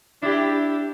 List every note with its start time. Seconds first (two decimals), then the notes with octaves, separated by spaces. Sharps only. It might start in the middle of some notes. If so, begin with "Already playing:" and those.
0.22 D4 E4 G4